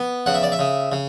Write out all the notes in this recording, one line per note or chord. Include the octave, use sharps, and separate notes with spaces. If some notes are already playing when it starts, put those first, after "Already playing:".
Already playing: B3
C#3 F#5
E5
D5
E5
C#3
C#3